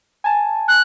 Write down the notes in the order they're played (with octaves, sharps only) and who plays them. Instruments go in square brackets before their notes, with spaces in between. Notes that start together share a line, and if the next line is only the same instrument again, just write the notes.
[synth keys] G#5 A5
[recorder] F#6